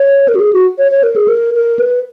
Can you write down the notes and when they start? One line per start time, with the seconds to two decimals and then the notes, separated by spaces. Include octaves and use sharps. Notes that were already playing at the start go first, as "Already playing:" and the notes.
Already playing: C#5
0.28 A#4
0.35 F#4
0.40 G#4
0.53 F#4
0.78 C#5
0.91 C#5
1.03 A#4
1.16 G#4
1.28 A#4
1.54 A#4
1.79 B4